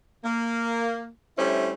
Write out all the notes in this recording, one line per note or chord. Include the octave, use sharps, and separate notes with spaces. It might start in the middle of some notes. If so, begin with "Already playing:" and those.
A#3
D3 G3 A3 C#4 E4 C5